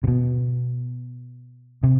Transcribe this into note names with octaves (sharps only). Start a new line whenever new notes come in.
C3
B2
C3